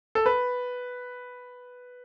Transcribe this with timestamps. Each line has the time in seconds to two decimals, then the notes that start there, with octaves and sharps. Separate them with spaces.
0.15 A4
0.26 B4